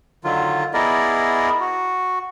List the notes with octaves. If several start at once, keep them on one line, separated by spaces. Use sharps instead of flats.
D3 D#3 F#3 F4
B3 E4 G#4 A#4 D5 D#5
F#4